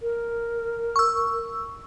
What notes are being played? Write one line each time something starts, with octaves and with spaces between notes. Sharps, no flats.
A#4
C#6 E6